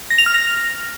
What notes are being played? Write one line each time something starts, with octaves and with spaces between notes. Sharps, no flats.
A#6
F7
F6
A#6